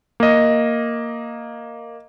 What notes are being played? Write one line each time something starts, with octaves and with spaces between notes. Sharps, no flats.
A#3 D#5